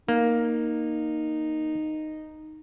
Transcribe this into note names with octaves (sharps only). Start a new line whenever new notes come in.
A#3 D#4